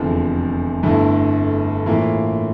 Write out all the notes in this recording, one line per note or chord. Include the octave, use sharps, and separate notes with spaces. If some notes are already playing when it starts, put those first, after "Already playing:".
Already playing: F1 E2 D3 F3
G1 G2 D3 A3 E4
A2 E3 A#3 F4